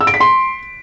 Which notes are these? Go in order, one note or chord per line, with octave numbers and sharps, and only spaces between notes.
E6
D7
B6
C6